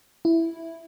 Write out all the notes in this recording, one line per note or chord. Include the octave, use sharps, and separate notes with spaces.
E4